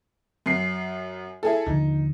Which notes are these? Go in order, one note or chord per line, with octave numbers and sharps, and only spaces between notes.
F#2 C7
E4 G#4 A4
D#2 D3 F3 D#4